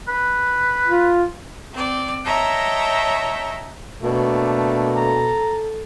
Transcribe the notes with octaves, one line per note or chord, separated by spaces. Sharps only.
B4
F4
C4 D5
C#5 D#5 E5 G5 A5 A#5
B2 A3 A#3 D4
A4 A#5